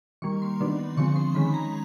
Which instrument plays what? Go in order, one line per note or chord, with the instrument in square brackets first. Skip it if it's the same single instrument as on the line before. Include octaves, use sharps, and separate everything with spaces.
[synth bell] D#3 G3 A#3 C#6
C6
D#3 F#3 B3 D4
D3 F3 G#3 C4 C#6
C6
D#3 G#3 C#4 B5
A#5